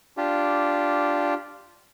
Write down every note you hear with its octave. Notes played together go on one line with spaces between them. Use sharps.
D4 F4 G4